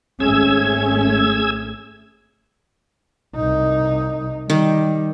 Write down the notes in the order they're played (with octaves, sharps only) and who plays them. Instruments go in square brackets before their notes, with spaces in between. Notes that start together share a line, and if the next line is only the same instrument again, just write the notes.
[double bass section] G#1 A3 C#4 [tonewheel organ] G#4 E6 G#6
[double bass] C2 D#4
[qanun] D#3 [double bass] G3